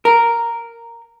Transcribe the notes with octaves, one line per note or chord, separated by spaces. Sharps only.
A#4